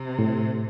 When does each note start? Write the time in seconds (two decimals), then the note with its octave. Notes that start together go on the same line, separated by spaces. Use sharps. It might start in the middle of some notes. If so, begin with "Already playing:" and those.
Already playing: C3
0.19 A2